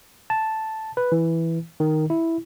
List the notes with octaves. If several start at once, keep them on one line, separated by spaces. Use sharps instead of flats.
A5
B4
E3
D#3
E4